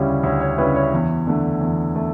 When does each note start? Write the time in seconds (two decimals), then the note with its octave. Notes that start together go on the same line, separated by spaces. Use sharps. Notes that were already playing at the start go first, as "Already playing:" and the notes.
Already playing: D2 C#3 G3 C#4 E4
0.23 D2 C#5
0.40 C#5
0.58 C#3 G3 C#4 E4 B4
0.76 C#5
0.93 E2
1.27 D3 A3
1.61 E2
1.96 A3